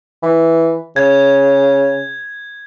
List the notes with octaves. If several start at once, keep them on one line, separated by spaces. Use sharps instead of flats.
E3
C#3 G#6